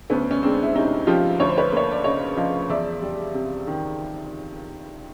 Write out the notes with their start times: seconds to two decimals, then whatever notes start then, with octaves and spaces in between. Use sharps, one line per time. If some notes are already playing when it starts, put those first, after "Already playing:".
0.10 D2 B3 C#4
0.31 C#4
0.43 G#3 C4 D4
0.63 E4
0.75 C3 C#4 D#4
1.07 F3 F4 G4
1.40 D2 C#5
1.49 C5
1.58 B4 C#5
1.72 A#3 C#5
1.91 D5
2.04 C#3 C#5 D#5
2.37 F3 D#5 F5
2.69 E2 D5 E5
3.02 G3
3.34 C3
3.67 D#3